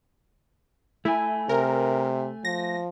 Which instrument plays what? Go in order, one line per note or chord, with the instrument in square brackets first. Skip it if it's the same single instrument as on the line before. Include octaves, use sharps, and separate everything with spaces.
[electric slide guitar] A3 G#5 [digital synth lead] E4
[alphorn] C3 [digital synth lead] A#4
[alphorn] F3 [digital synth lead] A#6